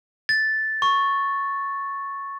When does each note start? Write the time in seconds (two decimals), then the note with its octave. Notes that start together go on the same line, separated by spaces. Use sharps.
0.29 A6
0.82 C#6